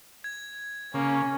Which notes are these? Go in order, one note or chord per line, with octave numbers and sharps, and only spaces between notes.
G#6
C#3 A#3 C#4